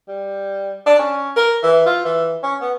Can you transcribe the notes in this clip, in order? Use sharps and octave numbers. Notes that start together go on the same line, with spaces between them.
G3
D4
C#4
A#4
E3
F4
E3
C#4
B3